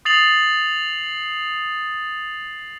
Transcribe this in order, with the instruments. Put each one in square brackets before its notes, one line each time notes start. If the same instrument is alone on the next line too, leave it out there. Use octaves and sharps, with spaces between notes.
[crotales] D#6 A6 C7 F7 F#7